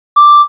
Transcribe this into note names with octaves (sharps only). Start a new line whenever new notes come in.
D6